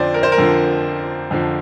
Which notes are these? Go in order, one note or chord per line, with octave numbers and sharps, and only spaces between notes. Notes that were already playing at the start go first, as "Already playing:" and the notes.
Already playing: F2 D3 F3 C5 D5
A#4
C5
A#4
F2 D3 F3
F2 D3 F3